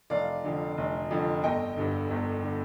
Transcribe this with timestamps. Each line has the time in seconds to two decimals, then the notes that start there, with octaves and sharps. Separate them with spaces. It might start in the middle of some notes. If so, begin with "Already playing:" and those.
0.10 F1 D5 F5
0.44 F2 D3
0.78 F1
1.11 F2 D3
1.43 G1 D#5 G5
1.77 G2 D3
2.10 G1
2.43 D3